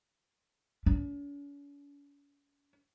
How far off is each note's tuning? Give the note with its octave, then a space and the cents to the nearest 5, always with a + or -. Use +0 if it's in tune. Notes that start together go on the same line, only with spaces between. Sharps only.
C#4 +45